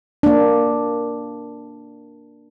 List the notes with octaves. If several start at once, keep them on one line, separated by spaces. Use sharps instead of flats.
A#3 D4